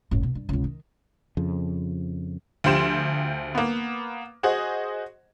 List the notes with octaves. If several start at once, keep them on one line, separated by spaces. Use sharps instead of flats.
F#1 A2
B2
G2
C#2 C3
D#3
F2 C#3 F3
D2 F3 G4 C6 E7
A#3 B3
F#4 G#4 C5 D#5